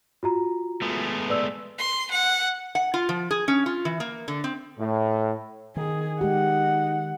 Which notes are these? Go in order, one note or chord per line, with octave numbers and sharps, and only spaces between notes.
F4 F#4 A#5
G#3 A3 B3
B4 D5 E6
C6
F#5
F#5
F4
F3
G#4
C#4
F4
E3
A#3
D3
C4
A2
D#3 G#4
G#3 D#4 G4 F#5